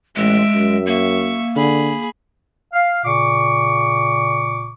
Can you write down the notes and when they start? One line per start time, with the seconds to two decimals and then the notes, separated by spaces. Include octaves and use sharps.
0.16 A1 G#3 E5 D7
0.55 F#2
0.87 A#3 E5 C#6
1.56 D3 G#4 B5
2.72 F5
3.05 A#2 C#3 C#6 D6